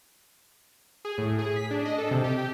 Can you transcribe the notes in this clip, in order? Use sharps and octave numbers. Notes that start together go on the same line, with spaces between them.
G#4
A2
G#4
B6
D4
D#5
A4
C3
G4
G4